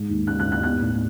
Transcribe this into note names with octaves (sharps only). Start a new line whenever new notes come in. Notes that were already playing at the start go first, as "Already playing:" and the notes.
Already playing: G#2 G#3
D#2
C#3 F#6
F#6
D#2
F#6
B3 F#6
A2